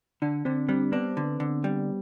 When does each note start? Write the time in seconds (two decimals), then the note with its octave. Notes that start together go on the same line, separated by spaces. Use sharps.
0.22 D3 D4
0.45 D3 C4
0.68 G3 C4
0.92 B3 D4
1.17 D3
1.40 D3
1.64 G3